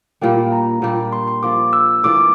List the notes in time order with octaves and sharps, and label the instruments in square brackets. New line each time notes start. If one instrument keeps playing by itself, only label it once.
[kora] A#2 G3 A#3 D4 [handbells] G5
[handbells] A#5
[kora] A#2 G3 D4 G4
[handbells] C6
C6
[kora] F3 A#3 D4 [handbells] D6
[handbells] E6
[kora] E3 A#3 D4 F4 [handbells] D6